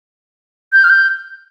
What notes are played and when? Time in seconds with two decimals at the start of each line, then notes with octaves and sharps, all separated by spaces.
0.73 G6
0.84 F6
0.90 G6